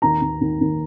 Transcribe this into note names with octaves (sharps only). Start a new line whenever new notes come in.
D#2 A#5
D#2
D#2
D#2